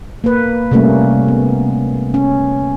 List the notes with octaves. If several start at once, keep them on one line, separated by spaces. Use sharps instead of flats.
A#3 B4
C3 G3 A3 A#3 C#4
B3
C#4